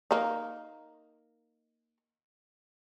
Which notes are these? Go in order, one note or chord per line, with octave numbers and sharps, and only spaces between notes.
A#3 D#4